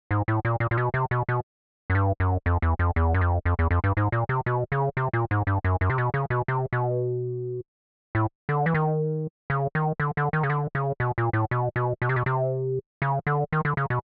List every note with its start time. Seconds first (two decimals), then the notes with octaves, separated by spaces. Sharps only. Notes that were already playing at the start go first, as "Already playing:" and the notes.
0.11 G#2
0.28 A2
0.45 A#2
0.60 A#2
0.71 A#2
0.77 B2
0.94 C3
1.11 B2
1.29 B2
1.90 F#2
1.95 G2
2.20 F#2
2.46 F2
2.62 E2
2.79 F2
2.96 E2
3.14 F#2
3.21 F2
3.45 F2
3.59 E2
3.71 F2
3.84 G2
3.97 G#2
4.12 A#2
4.29 C3
4.46 B2
4.72 C#3
4.97 C3
5.13 A#2
5.31 G#2
5.47 G2
5.64 F#2
5.81 F#2
5.90 C3
5.98 B2
6.14 C#3
6.30 B2
6.48 C3
6.73 B2
8.15 A2
8.49 D3
8.66 E3
8.74 D#3
9.50 C#3
9.75 D#3
10.00 D3
10.17 D3
10.33 D#3
10.43 C#3
10.50 D3
10.75 C#3
11.00 B2
11.18 A#2
11.33 A2
11.51 B2
11.76 B2
12.02 B2
12.09 C3
12.16 B2
12.26 C3
13.02 C#3
13.27 D3
13.53 D#3
13.65 D3
13.77 C#3
13.90 B2